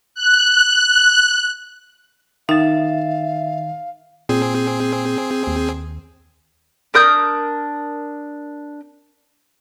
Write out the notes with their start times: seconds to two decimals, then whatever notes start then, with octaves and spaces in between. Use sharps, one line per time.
0.15 F#6
2.49 D#3 D#4 E5 F5 A6
4.29 A#2 C4 G#4
5.47 D#2
6.94 D4 A#4 D#6 G6